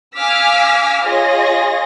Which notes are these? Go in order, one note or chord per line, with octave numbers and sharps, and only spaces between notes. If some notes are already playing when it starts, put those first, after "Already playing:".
F5 G#5 D6 E6 F6 B6
F4 G#4 C#5 D#5 A#6